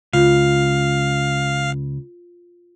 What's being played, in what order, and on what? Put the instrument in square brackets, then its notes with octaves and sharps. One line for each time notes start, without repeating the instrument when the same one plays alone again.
[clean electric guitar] C#2 [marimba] F4 [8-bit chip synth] F5